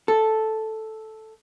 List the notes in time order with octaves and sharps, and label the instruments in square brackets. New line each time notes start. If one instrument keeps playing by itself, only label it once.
[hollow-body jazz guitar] A4